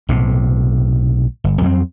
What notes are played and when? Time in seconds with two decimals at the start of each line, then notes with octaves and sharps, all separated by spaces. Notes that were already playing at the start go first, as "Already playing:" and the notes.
0.09 B1 A2 C3
1.44 G1
1.61 F2 F#3 B3 C4